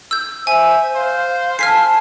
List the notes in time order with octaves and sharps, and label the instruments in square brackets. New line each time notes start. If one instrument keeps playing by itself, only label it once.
[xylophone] E6 G6
[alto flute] C5 [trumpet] E5 [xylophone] G#5
[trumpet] C5 [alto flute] F5
[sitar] A4 [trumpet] G#5 [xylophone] F6 B6 C7